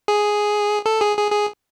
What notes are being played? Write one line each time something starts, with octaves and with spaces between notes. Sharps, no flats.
G#4
A4
G#4
G#4
G#4